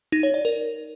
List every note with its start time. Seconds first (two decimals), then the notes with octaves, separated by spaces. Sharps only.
0.12 D#4
0.23 C#5
0.34 D5
0.45 A#4